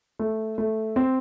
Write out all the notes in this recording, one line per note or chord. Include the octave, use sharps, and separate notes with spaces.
A3
A3
C4